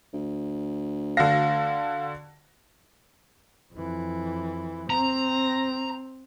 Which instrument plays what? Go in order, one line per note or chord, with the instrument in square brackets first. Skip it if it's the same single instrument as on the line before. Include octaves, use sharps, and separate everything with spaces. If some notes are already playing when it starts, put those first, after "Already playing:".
[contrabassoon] D2
[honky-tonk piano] D3 F#4 A#6 [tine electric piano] F5
[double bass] F2 E3
[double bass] C4 [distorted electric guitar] A#5